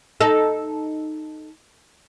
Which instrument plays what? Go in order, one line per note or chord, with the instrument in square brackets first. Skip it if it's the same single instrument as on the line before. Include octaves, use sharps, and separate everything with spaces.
[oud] D#4 A4